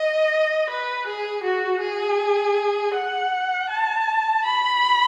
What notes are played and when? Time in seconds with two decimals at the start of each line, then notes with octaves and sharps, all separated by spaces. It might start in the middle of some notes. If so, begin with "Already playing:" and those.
Already playing: D#5
0.70 B4
1.07 G#4
1.44 F#4
1.82 G#4
2.95 F#5
3.70 A5
4.45 B5